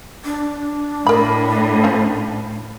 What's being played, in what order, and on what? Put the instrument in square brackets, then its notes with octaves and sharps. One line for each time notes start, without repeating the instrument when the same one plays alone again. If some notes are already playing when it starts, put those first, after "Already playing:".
[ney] D4
[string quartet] A2 [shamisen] A#4 B5
[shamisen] F3 C#4